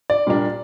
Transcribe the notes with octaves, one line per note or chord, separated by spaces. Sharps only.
D5
A#2 G3 A#3 D4